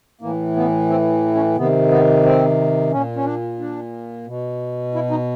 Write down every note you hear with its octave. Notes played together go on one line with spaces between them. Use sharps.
A2 E3 A#3
B3
C4
C#4
C3 D#3 B3
B3
C4
A#2 C#4
C#4
D4
D4
B2
E4
D#4